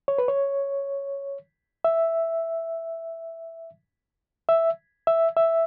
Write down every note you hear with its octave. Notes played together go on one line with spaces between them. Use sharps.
C#5
B4
C#5
E5
E5
E5
E5